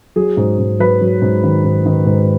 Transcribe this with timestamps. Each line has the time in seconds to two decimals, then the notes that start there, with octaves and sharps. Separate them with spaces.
0.16 F#3 G#4
0.37 G#2
0.58 G#2
0.80 F#3 B4
1.02 F#3
1.22 G#2
1.43 D#3
1.64 G#2
1.86 D#3
2.06 G#2